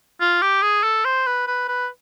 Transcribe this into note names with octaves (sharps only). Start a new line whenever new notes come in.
F4
G4
G#4
A4
C5
B4
B4
B4